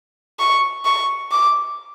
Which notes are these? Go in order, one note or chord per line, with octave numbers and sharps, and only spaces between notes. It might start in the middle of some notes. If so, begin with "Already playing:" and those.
C#6
C#6
D6